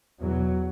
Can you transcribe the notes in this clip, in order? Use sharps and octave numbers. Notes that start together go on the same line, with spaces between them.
E2 B2 F#3